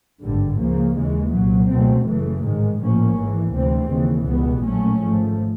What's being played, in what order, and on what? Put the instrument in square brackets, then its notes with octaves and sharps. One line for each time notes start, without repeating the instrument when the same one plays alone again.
[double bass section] G#1 G2 D3 G3
C#2 C#3 F3 A#3
D#2 C#3 E3 G#3
C2 A#2 F#3
C#2 B2 F#3 A3 C4
F#1 F#2 C#3 E3 A3
A1 G#2 D#3 G#3
A#1 A2 F3 A#3 C#4
G#1 G#2 E3
D2 C3 E3 G3 C4
D#2 C#3 E3
C#2 B2 G3 B3
A#1 A#2 F#3 A3 C#4
G#1 G#2 F3 A3